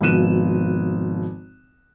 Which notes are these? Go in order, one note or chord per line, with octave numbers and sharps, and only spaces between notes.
G#1 B2 F3 F#6 D#7 E7